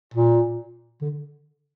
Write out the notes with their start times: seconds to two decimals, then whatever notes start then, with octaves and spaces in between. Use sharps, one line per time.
0.14 A#2
1.02 D3